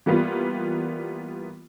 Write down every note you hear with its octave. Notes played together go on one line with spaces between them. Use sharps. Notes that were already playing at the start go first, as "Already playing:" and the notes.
E3 G3 A#3 B3 F4